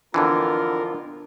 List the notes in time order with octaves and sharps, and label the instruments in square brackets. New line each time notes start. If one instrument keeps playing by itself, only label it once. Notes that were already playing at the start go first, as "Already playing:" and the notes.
[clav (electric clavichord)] F2 D3 E3 [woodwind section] B3 F4 [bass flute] D4 [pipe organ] A#4